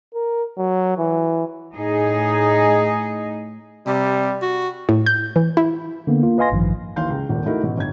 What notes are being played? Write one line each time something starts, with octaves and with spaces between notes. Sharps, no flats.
A#4
F#3
E3
A2 D#4 G#4 D#5
C3 G3
F#4
A2
G6
E3
E4
D3 A#3 B3
A#3 F4
B4 D#5 F5 G#5 C6 A#6
A1 G2 D#3 F3
D#2 E3 F5 C6 G6
C#2
D#1 G#1 A#2
A3 D#4 E4 F#4 A#4
A1 B2
G1 G#6